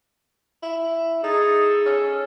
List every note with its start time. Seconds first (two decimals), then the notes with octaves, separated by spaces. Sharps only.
0.63 E4
1.24 D#4 G#4 A4
1.86 C#4